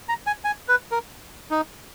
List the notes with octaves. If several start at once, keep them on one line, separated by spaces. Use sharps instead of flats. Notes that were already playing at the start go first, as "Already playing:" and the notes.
A#5
G#5
G#5
B4
A#4
D#4